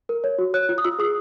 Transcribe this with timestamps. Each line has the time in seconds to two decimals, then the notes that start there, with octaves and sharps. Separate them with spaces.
0.09 A#4
0.24 C#5
0.38 F#4
0.54 C#5 F#6
0.69 F4
0.78 D#6
0.84 F4 E6
0.99 G#4 D#6